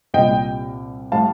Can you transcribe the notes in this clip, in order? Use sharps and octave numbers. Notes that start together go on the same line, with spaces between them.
C2 A#2 G3 D#5 G5
A2 G3 F5 A5